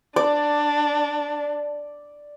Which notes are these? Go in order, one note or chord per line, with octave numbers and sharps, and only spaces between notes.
D4 D5